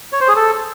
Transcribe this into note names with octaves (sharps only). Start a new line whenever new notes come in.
C#5
C5
G#4
A4